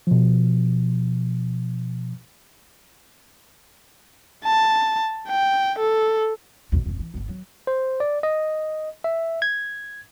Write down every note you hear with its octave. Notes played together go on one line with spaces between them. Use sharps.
B2 F3
A5
G5
A4
B1 E2
D#1 F2
E3
G1 B3
F#3
C5
D5
D#5
E5
G#6